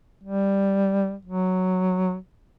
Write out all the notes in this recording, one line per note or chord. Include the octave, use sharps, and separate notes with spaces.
G3
F#3